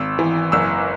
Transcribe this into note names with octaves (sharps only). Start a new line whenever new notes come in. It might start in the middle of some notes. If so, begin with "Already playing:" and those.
Already playing: G#1 E6
E3
F#1 E6